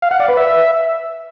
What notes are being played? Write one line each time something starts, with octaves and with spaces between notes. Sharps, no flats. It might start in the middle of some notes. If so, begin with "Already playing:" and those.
F5
F#5
D5
B4
E5